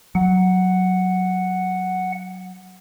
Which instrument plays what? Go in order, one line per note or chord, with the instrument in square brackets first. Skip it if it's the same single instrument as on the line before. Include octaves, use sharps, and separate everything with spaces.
[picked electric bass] F#3 [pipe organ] F#5